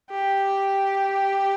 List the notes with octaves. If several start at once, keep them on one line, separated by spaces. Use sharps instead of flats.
G4